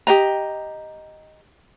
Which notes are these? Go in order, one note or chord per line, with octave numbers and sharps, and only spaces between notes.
G4 D#5 A#5